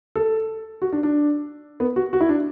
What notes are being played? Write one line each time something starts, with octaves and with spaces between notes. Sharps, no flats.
A4
F#4
D4
D4
B3
F#4
F#4
E4
D4